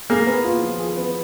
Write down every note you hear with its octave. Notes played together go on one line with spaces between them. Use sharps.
A#3 G#4
B3
F4
F3
G#4
B3